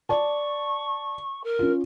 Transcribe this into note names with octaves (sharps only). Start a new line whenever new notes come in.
D5 A5 C#6
A#4
C#4 F4